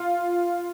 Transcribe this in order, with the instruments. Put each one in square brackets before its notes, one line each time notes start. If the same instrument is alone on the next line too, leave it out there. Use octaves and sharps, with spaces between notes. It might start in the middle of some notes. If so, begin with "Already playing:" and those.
Already playing: [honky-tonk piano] F4